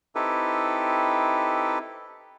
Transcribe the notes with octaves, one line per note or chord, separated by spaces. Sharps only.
C4 D#4 E4 G4 A4 B4